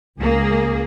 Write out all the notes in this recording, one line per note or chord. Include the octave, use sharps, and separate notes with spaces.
C#2 A#3 G#4